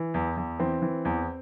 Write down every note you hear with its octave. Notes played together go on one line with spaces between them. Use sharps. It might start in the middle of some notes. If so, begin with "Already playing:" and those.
Already playing: E3
E2
E2
E3 C4
E3
E2